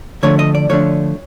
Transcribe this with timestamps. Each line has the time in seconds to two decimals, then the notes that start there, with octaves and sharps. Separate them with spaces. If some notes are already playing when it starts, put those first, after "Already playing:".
0.23 D3 F3 A3 D4 C#5
0.39 D#5
0.55 D5
0.69 D3 F3 A3 D4 C#5